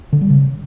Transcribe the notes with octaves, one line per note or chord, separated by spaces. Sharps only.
D3
G3
C#3